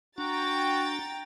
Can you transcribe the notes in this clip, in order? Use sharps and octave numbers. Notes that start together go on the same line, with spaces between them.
D4 F#4 G5 A#5 A6